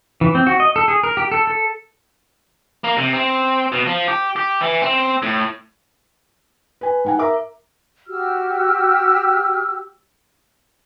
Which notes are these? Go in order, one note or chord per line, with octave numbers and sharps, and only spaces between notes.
E3
C4
F#4
D#5
A4
G#4
A#4
G4
A4
A4
A#3
C3
C4
B2
F3
G4
G4
E3
C4
A2
B4 G#5
G#2 F#5 G#5
A#4 E5 A#5 D6
F#4 G4 E6 F6